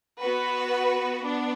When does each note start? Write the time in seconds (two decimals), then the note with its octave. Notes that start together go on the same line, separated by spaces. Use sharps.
0.21 B3 F#4 B4
1.23 B3 D4